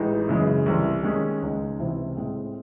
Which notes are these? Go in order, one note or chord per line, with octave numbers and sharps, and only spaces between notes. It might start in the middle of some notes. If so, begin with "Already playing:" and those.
Already playing: A1 A2 E3 G#3 D#4
F#2 C#3 E3 G#3
C2 C3 E3
D#3 G#3 C#4
C#2 C#3 G#3 D#4
C#2 C3 E3 C4 E4
A2 G#3 C4